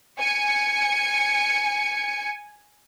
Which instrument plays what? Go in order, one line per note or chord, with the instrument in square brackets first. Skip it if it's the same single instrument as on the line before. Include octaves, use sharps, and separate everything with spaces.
[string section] G#5 C#7